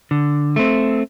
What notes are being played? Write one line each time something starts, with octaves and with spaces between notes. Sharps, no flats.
D3
A3 C4